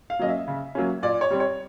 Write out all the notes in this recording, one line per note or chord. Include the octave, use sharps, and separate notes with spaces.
F5
F#3 A#3 C#4 D#5
E5
C#3
F#3 A#3 C#4
A#2 D5
C#5
G3 C4
C#5